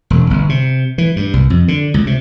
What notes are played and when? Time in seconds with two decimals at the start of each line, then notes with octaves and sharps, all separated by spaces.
0.10 E1
0.30 G1
0.49 C3
0.98 E3
1.16 G2
1.33 C2
1.50 F2
1.68 D3
1.94 C#2
2.07 C3